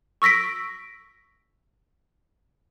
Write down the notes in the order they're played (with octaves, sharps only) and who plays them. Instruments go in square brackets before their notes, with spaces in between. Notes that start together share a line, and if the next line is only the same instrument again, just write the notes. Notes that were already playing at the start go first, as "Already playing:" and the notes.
[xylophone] C#6 E6 A#6 B6 D7